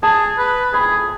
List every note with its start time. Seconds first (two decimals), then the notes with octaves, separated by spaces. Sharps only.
0.03 G#4 A5
0.38 B4
0.73 G#4 B5